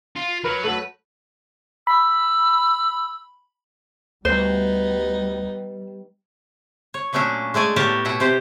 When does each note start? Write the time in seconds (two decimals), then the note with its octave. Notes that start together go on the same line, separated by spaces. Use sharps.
0.16 F4
0.44 F#3 A#4 B4
0.64 F#3 A3 B4
1.87 B5 E6
4.25 D2 G3 B3 D#4 C5
6.94 C#5
7.13 A#2 F#3 A3 C#4 D4
7.54 G#3 A3 D5 G#5
7.76 A2 B3 G4 A#4 C#5 A5
8.05 B2 E4 F#5 G5
8.20 C3 G4 C5